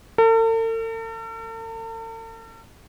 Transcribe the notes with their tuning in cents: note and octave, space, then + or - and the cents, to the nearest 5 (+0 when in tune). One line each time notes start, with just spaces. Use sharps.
A4 +45